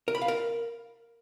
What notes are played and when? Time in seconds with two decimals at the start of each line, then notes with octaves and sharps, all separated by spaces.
0.08 A#4
0.15 B5
0.21 F5
0.28 A#4